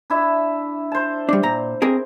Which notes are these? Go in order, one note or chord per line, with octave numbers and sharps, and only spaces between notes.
D4 E4 E5
C5 A5
G3 D4
A#2 A#5
C4 G#4 A#4